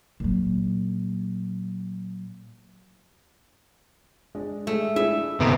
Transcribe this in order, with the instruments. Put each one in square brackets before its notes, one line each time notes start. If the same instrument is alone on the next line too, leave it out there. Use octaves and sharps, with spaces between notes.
[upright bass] A#2 F#3
[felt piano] G#3 D4
[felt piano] G#3 [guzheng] A3
[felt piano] D4 E4 G#4 [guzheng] E5
[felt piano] G#3
[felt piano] G#1 A4 A#5 [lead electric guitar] C3 B3